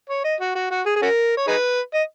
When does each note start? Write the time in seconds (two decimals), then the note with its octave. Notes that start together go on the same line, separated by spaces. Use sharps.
0.09 C#5
0.24 D#5
0.40 F#4
0.55 F#4
0.71 F#4
0.86 G#4
0.96 G#4
1.02 C#4 F#4 A#4
1.37 C#5
1.47 D#4 G#4 B4
1.94 D#5